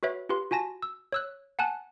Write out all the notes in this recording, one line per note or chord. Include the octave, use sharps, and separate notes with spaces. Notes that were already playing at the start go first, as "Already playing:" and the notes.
F#4 B4 C#5 E5
F4 G4 B4 C6
F4 F#4 G#5 A5 A#6
E6
C#5 E6 F#6
F#5 G#5 A5 F#6